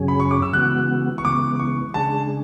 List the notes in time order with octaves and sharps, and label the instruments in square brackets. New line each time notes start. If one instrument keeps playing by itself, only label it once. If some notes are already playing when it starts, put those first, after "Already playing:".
Already playing: [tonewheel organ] F#2 C#3 F#3 C#4 G#4
[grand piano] B5
C#6
D6
E6
[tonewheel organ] C#3 E3 G#3 B3 F#4 [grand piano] F#6
[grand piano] C#6
[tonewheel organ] C#3 E3 G#3 B3 [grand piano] D6
[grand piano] C#6
[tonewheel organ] C#3 G#3 D4 G#4 [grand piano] A5